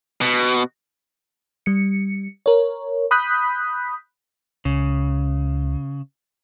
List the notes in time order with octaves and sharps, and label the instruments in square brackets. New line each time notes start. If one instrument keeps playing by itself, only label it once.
[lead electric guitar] B2
[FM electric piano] G3 C#7
A#4 C#5
B5 D#6 F#6 G6 B6
[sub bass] C#2 [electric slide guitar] C#3